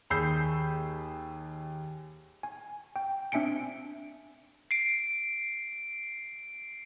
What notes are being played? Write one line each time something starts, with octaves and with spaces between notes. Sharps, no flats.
D#2 G#4 B5 E6 G6 C7
G#5
G5
C4 D4 E5 G#5 C#7 D7
C7 D7